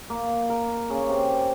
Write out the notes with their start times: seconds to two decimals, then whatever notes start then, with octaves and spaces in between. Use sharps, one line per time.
0.10 A#3
0.50 A#4
0.90 C#3
1.09 C3